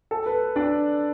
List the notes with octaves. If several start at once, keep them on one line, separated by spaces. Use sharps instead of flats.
A4
B4
D4 D5